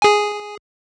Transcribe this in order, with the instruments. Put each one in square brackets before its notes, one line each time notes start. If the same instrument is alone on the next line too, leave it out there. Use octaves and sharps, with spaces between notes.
[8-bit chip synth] G#4 G#5